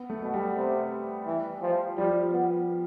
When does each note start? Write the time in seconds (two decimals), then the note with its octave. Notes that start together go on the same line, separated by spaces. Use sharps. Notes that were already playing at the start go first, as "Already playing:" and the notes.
Already playing: B3
0.10 A3
0.22 B2
0.34 G3
0.56 C3
1.26 E3
1.62 F3
1.97 F3 G3
2.32 B3